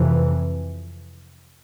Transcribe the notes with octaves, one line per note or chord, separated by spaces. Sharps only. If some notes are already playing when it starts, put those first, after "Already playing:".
Already playing: F2 C3 E3